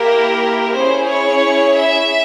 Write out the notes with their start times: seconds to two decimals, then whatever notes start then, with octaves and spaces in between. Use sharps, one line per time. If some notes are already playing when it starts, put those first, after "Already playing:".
Already playing: A#3 E4 G4 A#4
0.73 C#4 E4 G#4 C5
1.08 C#5
1.78 E5